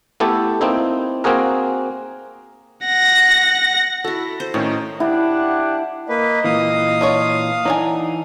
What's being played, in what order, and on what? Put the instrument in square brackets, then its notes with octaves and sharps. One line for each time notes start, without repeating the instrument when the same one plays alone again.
[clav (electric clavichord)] A3 B3 E4 G4 A4
A#3 C4 D#4 E4
A#3 C4 F#4 G#4 A#4
[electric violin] F#5 A#6
[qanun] E4 F#4 [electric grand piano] A4
[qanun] C5
[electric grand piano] A2 D#3 C#4 [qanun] D#4
[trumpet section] D4 G4 F#5 [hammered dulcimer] E4
[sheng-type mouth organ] A#3 B4 [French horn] D#5
[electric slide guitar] A#2 E3 [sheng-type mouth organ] F5 D#6
[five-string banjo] D4 F4 C#5
[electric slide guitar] E3 D#4 [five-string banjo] F#3 D4 G#5